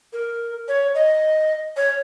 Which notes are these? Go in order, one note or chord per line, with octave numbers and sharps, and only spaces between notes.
A#4
C#5
D#5
C#5